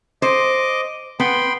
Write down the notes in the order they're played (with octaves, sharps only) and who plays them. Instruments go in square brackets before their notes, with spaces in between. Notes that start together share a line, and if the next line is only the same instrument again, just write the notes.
[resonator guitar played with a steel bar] C5 [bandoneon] D#5 D6
[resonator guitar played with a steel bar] B3 [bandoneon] G5 B5 C6